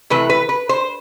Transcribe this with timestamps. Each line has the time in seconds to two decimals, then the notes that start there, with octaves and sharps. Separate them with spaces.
0.10 C3 E3 A3 B4
0.30 B4
0.49 B4
0.69 C5